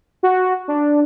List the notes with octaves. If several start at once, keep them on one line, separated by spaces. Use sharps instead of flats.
F#4
D4